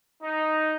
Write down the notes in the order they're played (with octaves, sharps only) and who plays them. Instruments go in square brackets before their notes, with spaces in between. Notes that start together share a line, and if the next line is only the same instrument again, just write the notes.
[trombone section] D#4